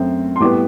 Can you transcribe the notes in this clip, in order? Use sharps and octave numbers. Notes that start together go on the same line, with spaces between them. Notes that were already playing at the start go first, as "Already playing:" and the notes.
Already playing: F#2 A3 C4
C6
A2 G3 B3 D6